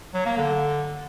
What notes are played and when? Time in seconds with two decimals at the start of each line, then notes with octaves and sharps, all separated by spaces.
0.14 F#3
0.26 A#3
0.38 D3